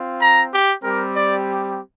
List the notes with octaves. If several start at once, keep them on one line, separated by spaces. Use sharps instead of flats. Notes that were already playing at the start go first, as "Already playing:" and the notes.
Already playing: C4 F4
A#5
G4
G3 C4 G4 A#4
D5